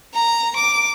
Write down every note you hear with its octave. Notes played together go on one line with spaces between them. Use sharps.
A#5
D6